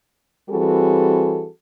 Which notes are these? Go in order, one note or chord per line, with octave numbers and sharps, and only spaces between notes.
E3 G3 C4 F#4 G#4 A4